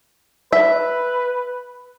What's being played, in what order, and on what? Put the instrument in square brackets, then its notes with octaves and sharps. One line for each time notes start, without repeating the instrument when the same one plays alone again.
[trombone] B4 [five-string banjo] E5